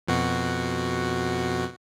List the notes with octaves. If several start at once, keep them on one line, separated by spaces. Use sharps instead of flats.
F2 B2 F#4